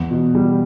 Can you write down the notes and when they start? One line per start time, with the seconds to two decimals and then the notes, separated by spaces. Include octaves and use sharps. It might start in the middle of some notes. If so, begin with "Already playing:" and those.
Already playing: E2
0.11 B2
0.35 G3